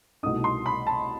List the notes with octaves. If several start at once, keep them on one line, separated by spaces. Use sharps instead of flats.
C2 B2 A3 D#4 D#6
C6
B5
A5